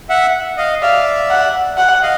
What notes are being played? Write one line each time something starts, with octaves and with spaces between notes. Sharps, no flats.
E5 F#5
D#5 F5
D5 E5 F5
F#5
F#5
D#5 F5